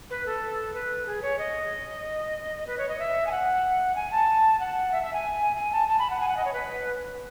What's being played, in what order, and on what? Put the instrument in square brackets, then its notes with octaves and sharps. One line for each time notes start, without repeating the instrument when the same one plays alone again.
[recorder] B4
A4
B4
G#4
C#5
D#5
B4
C#5
D#5
E5
G#5
F#5
G#5
A5
F#5
E5
E5
G#5
G#5
A5
A5
B5
F#5
G#5
F#5
D#5
C#5
B4